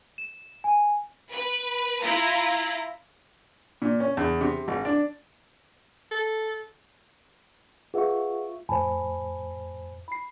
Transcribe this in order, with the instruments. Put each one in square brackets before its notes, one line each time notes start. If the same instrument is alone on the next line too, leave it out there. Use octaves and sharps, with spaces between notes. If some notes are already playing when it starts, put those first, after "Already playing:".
[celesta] E7
G#5
[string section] B4
E4 F4 A#5
[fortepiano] A#2
C#4
E2
C3
G#1
D4
[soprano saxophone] A4
[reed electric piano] F4 E5 C#6 [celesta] G#4 B4 F#5
[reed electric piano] F2 A2 C5 [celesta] G#5 A5 B5
[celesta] B5 C7